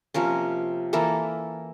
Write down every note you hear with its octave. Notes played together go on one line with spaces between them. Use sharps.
C3 F3 A#3 C#4
E3 A#3 E4 A4